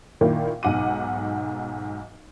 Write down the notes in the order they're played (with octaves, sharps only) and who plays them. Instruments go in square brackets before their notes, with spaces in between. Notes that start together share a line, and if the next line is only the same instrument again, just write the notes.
[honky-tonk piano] A#2 D#3 A#3 E4
B1 G#2 F#5 D6 D#7